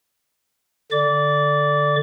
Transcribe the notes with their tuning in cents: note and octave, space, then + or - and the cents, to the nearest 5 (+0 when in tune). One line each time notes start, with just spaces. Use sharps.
D3 +0 D5 +0 D6 -25